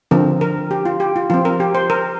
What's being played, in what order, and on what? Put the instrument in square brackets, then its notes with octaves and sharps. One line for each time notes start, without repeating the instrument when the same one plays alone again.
[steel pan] D3 F3 C4 A#4
A#4
G4
F4
G4
F4
F3 C4 F4
A#4
G4
C5
A#4